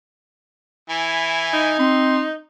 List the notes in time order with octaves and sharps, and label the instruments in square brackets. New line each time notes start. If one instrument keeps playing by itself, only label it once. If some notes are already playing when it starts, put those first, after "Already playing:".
[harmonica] E3 E4 G#5
[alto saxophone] D#4
[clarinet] C4 [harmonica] C6